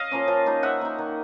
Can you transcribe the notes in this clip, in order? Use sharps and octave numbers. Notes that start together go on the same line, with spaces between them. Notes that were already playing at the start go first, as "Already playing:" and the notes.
Already playing: D#5 F5
F3 A#3 C#4
F3
A#3 D#4
F3 E5 F#5
A#3 D#4
D#3